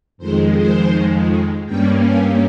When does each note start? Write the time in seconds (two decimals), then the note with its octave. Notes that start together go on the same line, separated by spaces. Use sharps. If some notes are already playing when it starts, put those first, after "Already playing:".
0.17 F2 D#3 G#3 C5
0.55 C5
1.66 G2 G3 A#3 C#4 G5
2.04 G#5